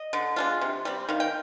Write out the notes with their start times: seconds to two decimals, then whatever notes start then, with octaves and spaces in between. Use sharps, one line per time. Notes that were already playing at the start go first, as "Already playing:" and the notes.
Already playing: D#5
0.13 D3
0.36 G#3 D4 F4
0.61 C3
0.85 G3 C4
1.09 D#3 F5
1.20 G5